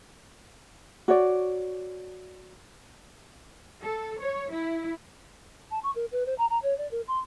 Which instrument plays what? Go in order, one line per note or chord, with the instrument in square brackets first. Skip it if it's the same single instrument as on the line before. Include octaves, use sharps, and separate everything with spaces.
[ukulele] F#4 C#5 D5
[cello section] A4
C#5
E4
[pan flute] A5
C#6
A#4
B4
C5
A#5
A#5
C#5
D5
A#4
C6